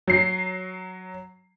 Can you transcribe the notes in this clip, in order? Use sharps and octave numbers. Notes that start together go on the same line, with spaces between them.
F#3 C7